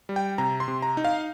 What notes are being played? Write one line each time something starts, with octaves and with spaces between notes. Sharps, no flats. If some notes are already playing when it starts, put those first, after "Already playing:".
G3
G5
C3 A#5
C6
C3
A#5
D#4
F5